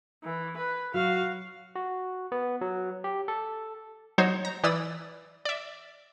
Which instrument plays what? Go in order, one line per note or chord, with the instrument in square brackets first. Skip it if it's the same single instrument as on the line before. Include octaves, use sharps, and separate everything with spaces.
[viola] E3
B4
[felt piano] F#3 [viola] F#4 F5
[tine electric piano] F#4
B3
F#3
G4
A4
[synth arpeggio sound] F#3 D#4 C5 C#5
A#5
E3 D5 D#6 E6
D5 E5